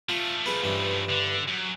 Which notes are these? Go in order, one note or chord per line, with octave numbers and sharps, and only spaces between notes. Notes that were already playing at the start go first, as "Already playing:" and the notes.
F3 A3 F4
G#4 B4
G2 E3 C#4
D3
F#2